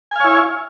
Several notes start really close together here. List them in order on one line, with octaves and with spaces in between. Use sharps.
G#5 F5 C#5 E4